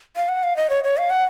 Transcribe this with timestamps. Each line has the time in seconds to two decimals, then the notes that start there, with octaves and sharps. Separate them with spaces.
0.16 F5
0.29 F#5
0.43 F5
0.57 D#5
0.70 C#5
0.84 C#5
0.98 F5
1.10 F#5